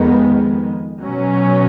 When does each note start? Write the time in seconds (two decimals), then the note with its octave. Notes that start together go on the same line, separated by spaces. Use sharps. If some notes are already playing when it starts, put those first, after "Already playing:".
Already playing: F2 D#3 G#3 B3
1.02 B2 F#3 C#4